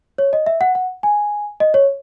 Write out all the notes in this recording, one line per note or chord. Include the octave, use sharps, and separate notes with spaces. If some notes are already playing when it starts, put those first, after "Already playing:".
C#5
D#5
E5
F#5
F#5
G#5
D#5
C#5